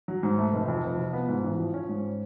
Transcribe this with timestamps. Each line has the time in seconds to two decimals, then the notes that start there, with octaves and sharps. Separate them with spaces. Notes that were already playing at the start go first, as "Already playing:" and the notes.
0.08 F#3
0.23 G#2
0.38 A3
0.53 F1
0.68 F2
0.84 F1
0.98 F3
1.13 B3
1.28 G#2
1.44 A1
1.59 F3
1.74 C#4
1.89 G#2